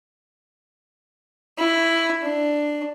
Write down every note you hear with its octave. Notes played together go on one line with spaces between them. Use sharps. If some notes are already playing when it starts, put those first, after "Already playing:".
E4
D4